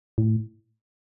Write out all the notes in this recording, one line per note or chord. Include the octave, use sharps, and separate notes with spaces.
A2